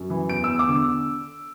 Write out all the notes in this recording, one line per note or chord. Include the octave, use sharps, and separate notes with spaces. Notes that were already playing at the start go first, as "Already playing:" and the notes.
Already playing: F#2
E3
E2 D7
E6
E2
D6
D3